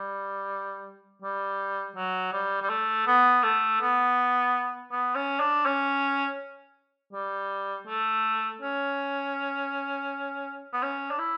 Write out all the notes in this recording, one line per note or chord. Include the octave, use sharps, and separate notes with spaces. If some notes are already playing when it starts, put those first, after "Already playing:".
Already playing: G3
G3
F#3
G3
G3
A3
B3
A3
B3
B3
C#4
D4
C#4
G3
A3
C#4
B3
C#4
D4
E4